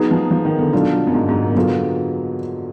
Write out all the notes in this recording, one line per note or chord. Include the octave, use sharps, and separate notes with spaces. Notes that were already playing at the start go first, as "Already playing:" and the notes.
Already playing: F#3 B3 D#4 G#4
F3
F3
D#3
D3
B2 F#3 D4 F4
F#2
G#2
G#2
A#2
B2
D3 F#3 B3 F4 G#4